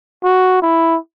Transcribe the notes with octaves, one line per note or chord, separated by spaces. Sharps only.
F#4
E4